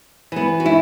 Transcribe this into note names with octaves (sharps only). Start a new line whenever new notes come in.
E3 B3
F#4
E4